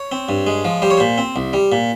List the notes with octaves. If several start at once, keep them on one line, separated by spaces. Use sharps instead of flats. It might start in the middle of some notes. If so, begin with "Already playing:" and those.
Already playing: C#5
C4
G2
G#3
F3
G3 C5
C#5
A#2 C5
C4
C2
G3
A#2